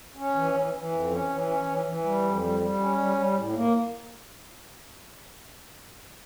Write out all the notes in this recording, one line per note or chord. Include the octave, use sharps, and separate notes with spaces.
C#4
E3
E3
E3
F2
C#4
E3
C#4
E3
E3
G3
F2
G3
G3
C#4
G3
G3
A2
A#3